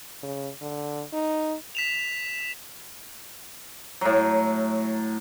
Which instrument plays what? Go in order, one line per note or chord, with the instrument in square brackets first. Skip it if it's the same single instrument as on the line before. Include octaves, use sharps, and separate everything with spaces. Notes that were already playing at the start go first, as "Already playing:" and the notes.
[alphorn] C#3
D3
D#4
[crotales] B6 E7 F7
[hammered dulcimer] A2 F#3